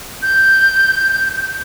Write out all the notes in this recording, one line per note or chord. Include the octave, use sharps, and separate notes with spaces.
G6